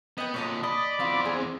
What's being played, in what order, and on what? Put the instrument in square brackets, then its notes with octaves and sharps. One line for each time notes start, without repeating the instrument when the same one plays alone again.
[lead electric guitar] B3 [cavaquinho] D#5 G5
[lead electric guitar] A#2 D3 [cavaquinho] C#5 D#5 A5
[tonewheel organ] D5 B5 D6 [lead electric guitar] D#5 [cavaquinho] D#6
[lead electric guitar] E2 C4 [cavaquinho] F4
[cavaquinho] G#4